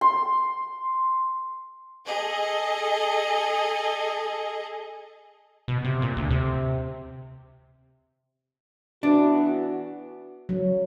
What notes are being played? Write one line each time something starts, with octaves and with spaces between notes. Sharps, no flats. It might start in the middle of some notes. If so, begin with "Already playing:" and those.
C6
G#4 A4 D#5
B2
C3
A#2
D2
C3
E3 B3 D4 F#4
F#3